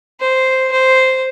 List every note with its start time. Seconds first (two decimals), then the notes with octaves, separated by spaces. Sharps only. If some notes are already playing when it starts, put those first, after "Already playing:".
0.20 C5
0.72 C5